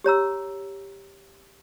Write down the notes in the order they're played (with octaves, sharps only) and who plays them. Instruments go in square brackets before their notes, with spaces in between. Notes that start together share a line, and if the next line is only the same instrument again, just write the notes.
[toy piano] G4 C#5 A#5 E6